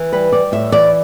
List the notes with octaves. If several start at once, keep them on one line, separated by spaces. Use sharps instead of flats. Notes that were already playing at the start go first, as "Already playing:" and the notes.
Already playing: E3
G3 B4
G3 D5
A2 E5
E3 D5